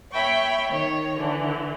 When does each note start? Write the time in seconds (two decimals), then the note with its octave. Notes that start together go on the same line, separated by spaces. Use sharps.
0.12 C#5 E5 G5 B5 C#6
0.69 D#3 C#5
1.17 D3 E3